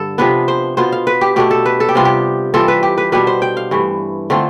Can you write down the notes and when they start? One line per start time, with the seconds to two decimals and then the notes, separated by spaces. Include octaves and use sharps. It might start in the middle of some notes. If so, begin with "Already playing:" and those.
Already playing: G2 D3 A4
0.18 C3 F3 B3 D4 B4
0.48 C5
0.77 B2 B3 F4 C5
0.92 F5
1.07 B4
1.21 G4
1.36 B2 A3 D4 G4
1.51 A4
1.66 B4
1.80 A4
1.89 G4
1.95 C3 G3 B3 F4
2.05 G4
2.54 E3 G3 C4 F4 A4
2.68 B4
2.83 G4
2.98 B4
3.12 B2 G3 B3 D4 B4
3.27 C5
3.42 G5
3.57 F5
3.71 G2 E3 A3
4.30 D3 A3 C4 F4